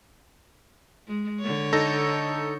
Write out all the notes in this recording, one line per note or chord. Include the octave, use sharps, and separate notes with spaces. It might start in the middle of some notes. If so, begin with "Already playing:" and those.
G#3
D3 C#5
D#4 A4 A#6